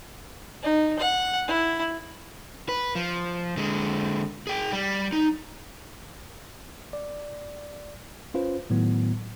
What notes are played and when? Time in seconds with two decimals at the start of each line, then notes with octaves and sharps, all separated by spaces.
0.63 D#4
0.99 F#5
1.48 E4
2.69 B4
2.95 F3
3.57 D3 G#3
4.47 G#4 G5
4.73 G3
5.13 D#4
6.93 D5
8.34 C#4 F4 B4 C5
8.70 A2 D#3 F#3 B3